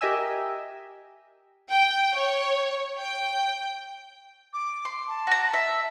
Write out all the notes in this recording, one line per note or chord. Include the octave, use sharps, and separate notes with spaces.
G4 A#4 D#5 E5 G#5 E6
G5
C#5
G5
D6
C6
A5
F#4 A#5
E5